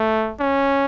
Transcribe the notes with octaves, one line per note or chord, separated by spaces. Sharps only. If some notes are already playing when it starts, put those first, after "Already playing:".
Already playing: A3
C#4